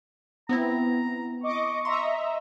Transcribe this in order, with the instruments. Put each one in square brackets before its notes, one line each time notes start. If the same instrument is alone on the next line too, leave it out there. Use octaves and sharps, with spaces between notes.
[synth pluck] B3 C4 E4 [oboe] A#5
[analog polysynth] D#5 D6 [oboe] C#6
[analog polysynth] D#5 E5 A#5 [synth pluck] C6